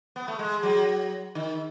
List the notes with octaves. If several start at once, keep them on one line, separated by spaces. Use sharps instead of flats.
B3
A3
G#3
F#3
D#3